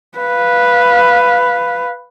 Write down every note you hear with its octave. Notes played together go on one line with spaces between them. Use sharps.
B4 F5